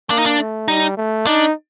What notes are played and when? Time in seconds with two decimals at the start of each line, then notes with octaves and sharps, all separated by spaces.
0.10 A#3 D4
0.18 D#4
0.26 D4
0.39 A3
0.68 G3 D#4
0.97 A3
1.26 D4 D#4